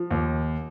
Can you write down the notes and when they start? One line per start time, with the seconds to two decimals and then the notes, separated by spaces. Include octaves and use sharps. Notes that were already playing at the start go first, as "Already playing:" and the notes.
Already playing: F3
0.11 D#2